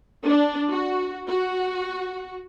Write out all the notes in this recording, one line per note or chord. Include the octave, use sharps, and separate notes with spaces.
D4
F#4
F#4